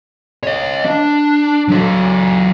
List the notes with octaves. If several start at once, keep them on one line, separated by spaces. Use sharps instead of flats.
C#5 D#5
D4
F#3 A4